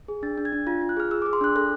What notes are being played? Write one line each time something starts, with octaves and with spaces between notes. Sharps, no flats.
G#4
D4 A6
D4
G#6
D4
F4 A#6
F4
F#6
G#4 F6
G#4 E6
G#4 D6
C6
D4 F#6
A4 F#6